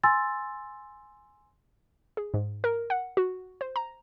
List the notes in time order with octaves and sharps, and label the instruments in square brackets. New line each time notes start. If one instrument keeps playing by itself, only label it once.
[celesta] G#5 C6 E6 A6
[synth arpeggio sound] G#4
G#2
A#4
F#5
F#4
C5
A#5